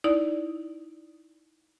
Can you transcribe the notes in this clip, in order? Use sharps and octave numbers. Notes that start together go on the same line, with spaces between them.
D#4 E4 D5